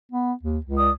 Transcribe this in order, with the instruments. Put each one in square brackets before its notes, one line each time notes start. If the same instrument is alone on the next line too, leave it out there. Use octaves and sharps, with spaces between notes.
[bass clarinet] B3
D#2
C#2
[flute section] D5 D#6